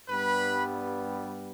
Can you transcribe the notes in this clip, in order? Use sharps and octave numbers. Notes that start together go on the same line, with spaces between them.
G2 G3 B3 B4 B5